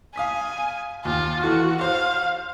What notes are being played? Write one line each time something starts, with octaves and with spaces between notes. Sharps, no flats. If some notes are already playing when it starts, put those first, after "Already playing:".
F5 G#5 D#6 B6
D#2 F4
E3 F#4 A4
C5 F5